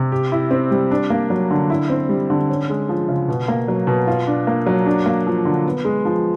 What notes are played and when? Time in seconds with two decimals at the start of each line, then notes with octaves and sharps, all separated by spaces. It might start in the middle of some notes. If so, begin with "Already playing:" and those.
Already playing: C3
0.12 G4
0.32 E4
0.51 C4
0.71 G3
0.91 D4
1.10 A#3
1.30 F#3
1.51 D3
1.70 E4
1.90 C4
2.09 G3
2.30 D3
2.49 C#4
2.69 G#3
2.89 F3
3.09 C#3
3.28 B2
3.48 A#3
3.68 F#3
3.87 B2
4.07 F4
4.27 D4
4.47 A#3
4.66 F#3
4.86 D4
5.06 A#3
5.27 F3
5.45 D3
5.66 B3
5.85 G#3
6.05 F3